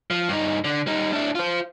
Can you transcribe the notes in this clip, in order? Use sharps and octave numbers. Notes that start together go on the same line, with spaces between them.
F3
G2 D#4
D3
G3 D#4
D4 E4
F4 C5